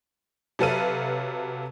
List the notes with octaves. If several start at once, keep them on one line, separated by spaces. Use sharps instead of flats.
C3 F#3 A4 B4 F5 D#7